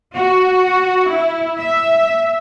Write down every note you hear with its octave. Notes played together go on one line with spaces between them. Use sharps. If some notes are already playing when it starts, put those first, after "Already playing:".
F#4
E4
E5